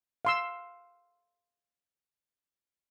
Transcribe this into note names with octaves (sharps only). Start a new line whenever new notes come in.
F5 C6 E6